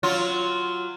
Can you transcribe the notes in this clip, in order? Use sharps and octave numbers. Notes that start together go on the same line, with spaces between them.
F#3 F4